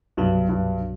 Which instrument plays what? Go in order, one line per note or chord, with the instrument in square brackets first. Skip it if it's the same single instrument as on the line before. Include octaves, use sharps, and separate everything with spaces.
[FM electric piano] C2 B2 F#3 [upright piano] G2
[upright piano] G2